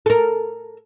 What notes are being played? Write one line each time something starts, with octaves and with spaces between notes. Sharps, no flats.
A4 A#4